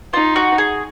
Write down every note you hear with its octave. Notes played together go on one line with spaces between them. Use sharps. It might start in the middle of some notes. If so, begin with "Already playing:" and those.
D#4 F4
F#4
G#4